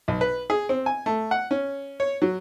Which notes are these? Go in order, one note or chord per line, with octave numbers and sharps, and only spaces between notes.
B1
B4
G#4
C4
G#5
A3
F#5
C#4
C#5
F#3